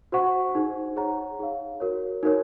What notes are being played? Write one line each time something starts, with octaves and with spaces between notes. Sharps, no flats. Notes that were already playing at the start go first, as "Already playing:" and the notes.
F#4 C5 F#5 C#6
D#4 G#4 C5
G#4 C#5 F#5 A#5
D#4 G#4 C#5 F5
F#4 A#4 C#5
D#4 F#4 A#4 C#5